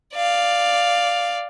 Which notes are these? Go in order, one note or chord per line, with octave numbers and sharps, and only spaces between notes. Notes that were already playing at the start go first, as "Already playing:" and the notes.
D5 F5